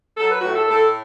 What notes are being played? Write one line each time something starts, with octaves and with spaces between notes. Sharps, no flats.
F#3 A4
B4
A2 F#4
A4
A2 A4